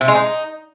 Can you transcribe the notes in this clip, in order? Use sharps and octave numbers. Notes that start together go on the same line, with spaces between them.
C3
G#3
D#4